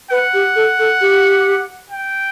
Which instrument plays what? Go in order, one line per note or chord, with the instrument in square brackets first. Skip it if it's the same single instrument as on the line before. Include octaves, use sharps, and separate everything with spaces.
[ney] B4 [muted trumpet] F#5
[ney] G4
A4
A4
G4
[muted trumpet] G5